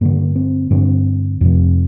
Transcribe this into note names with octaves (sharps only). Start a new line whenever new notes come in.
G2 D3 A#3
C4
G2 D3 C4
F2 C3